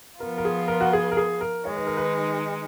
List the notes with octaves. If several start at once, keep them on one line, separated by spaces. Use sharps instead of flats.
F3 B3 F4 A#4
A#4
G#4
A#4
F#4
G#4
A#4
G#4
A#4
D#3 G#3 D#4 C#5
B4
A#4
B4